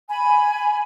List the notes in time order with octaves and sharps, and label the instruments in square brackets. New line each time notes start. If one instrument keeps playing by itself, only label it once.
[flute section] G#5 B5